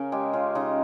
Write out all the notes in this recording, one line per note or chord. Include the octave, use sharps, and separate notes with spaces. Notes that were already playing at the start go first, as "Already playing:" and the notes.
Already playing: C#3 C#4 A#4
G#3 G4
C#3 F4
C#3 D#4